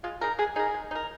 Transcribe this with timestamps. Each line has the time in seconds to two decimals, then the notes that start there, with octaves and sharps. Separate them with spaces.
0.04 G#3 F4
0.21 D#4 G#4 A#4
0.39 G#3 G#4
0.56 D#4 G#4 A#4
0.74 G#3
0.91 D#4 A#4